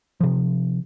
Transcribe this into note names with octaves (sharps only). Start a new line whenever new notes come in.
C3 F3